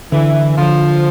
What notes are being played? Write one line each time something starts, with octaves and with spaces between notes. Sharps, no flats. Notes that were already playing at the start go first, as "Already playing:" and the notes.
D3 E3
D3 F3